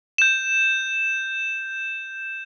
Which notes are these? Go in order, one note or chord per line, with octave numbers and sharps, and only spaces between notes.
G6 E7